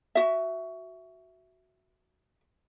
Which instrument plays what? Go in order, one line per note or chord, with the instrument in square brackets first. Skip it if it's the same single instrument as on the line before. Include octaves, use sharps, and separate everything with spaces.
[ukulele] F#4 E5